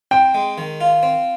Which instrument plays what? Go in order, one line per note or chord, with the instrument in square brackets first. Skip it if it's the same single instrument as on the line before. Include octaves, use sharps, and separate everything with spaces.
[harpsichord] C4 [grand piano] G5
[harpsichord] G#3
D#3
F4
C4